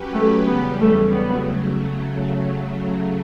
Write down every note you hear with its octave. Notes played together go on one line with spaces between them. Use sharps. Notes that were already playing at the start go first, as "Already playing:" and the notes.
Already playing: F#3 C#4 G4 B4
A3
E2 C#3 G3 B3
A3
C#3 F#3 A3 B3